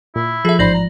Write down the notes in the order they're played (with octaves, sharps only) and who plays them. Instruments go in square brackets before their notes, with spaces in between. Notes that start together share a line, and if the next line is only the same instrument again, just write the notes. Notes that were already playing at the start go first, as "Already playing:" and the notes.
[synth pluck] A#2 [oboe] E4
[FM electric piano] F3 [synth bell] G#4 E5 [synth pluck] A4
[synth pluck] A1 G#2 B5 [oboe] C5 [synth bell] D5 A#6 F#7
[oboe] A#5